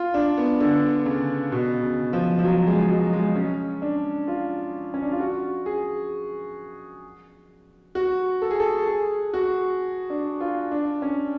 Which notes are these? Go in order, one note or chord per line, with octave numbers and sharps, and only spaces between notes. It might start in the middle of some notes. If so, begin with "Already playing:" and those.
Already playing: F4
D4
B3
D3
C#3
B2
C#3
F3
F3
F#3
G#3
F#3
G#3
C#4
D4
F4
C#4
D4
F4
F#4
G#4
F#4
A4
G#4
A4
G#4
F#4
D4
F4
D4
C#4